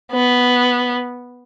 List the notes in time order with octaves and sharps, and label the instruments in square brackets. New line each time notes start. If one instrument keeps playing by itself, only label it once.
[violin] B3